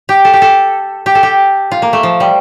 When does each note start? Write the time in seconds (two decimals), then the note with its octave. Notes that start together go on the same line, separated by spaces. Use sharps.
0.09 G4
0.25 A4
0.33 G4
0.42 A4
1.06 G4
1.15 A4
1.23 G4
1.71 F4
1.82 A#3
1.93 A3
2.03 F3
2.20 G3